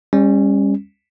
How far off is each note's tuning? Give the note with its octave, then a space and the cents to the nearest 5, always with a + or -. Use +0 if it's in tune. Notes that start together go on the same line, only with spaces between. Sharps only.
G3 +40 C#4 -10